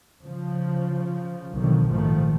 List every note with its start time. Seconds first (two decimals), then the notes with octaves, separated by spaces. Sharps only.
0.22 C#3 F3
1.54 B1 B2 D3 D#3 F3
1.88 A#1 G#2 B2 D#3 F3 A3